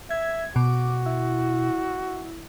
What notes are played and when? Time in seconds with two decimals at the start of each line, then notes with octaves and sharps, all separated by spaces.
0.11 E5 G#6
0.56 B2 F#4 D6
1.06 E4